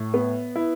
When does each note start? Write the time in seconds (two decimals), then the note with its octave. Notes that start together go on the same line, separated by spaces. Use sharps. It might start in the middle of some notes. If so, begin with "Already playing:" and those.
Already playing: A2
0.14 B3
0.56 E4